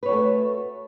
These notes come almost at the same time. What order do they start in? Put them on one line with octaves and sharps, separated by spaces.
B4 C#5 F#4 A3